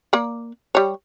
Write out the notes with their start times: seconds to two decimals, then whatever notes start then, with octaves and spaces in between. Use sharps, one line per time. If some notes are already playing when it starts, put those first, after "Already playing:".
0.13 A#3 D5
0.75 G3 C#5